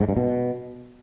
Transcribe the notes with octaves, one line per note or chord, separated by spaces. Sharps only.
G#2
G2
B2